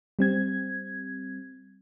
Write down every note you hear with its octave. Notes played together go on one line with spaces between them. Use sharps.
G3 C4 G#6